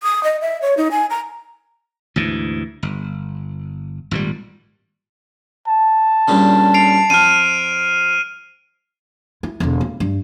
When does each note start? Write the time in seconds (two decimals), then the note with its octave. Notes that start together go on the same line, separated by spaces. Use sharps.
0.03 D#6
0.24 D#5
0.41 E5
0.62 C#5
0.77 D#4
0.91 G#5
1.10 A#5
2.16 D2 G#2 E3
2.83 G1
4.11 G#1 A#2 D3 G3
5.68 A5
6.28 G2 A#2 C#3
6.74 C7 D7 F7
7.10 F2 F6 D#7
9.43 E4
9.60 E1 D3
9.81 A#3
10.00 G2